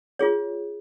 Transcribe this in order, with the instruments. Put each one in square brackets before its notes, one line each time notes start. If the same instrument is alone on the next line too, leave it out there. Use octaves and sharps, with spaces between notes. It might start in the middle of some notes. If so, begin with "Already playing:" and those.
[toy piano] F4 G#4 C#5